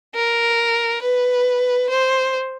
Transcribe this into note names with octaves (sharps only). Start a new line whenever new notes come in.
A#4
B4
C5